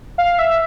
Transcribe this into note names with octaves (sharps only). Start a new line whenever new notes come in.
F5
E5